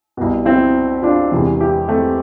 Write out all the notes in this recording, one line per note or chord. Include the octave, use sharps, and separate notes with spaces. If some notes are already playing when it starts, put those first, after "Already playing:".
C2 B2
C4 E4
D4 F4
E1 E2 C3 E3
E4 G4
A3 C4